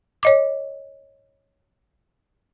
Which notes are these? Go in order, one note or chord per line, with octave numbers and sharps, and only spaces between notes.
C#5 D#5 D6